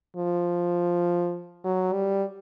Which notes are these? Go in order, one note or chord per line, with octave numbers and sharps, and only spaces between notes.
F3
F#3
G3